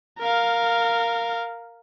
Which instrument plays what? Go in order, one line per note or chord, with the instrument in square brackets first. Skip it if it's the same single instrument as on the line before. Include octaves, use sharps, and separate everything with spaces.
[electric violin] A#4 F5